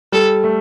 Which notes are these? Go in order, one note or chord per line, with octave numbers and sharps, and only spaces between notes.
G3 A4
A3